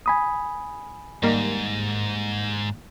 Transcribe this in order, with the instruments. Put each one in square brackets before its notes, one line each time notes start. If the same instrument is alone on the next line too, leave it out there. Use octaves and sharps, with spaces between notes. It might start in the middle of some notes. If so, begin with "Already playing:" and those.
[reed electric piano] G#5 B5 D#6
[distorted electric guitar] G#2 [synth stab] D#3 G3 A#3